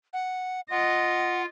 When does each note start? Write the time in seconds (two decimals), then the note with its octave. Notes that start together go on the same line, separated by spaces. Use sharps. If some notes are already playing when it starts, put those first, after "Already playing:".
0.13 F#5
0.71 F4 D#5 F#5